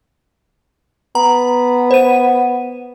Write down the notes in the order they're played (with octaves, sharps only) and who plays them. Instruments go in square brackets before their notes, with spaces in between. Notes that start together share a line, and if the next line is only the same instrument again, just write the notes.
[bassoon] B3 [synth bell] A#5
[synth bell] C5 D#7